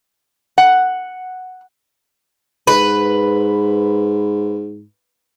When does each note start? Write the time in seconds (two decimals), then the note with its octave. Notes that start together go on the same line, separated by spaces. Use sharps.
0.58 F#5
2.67 G#2 B4